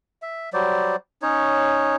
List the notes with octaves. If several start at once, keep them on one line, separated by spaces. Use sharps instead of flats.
E5
F#3 G3 C5 D5
C#4 D#4 C#5